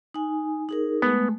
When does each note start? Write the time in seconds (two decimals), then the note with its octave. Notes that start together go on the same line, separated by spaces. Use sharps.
0.14 D#4 G#5
0.69 D#4 G#4 A#4
1.02 G#3 A3 B3